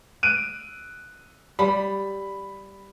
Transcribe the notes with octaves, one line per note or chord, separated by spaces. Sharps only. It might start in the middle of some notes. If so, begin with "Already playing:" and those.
F#6 D7 D#7
G3 B5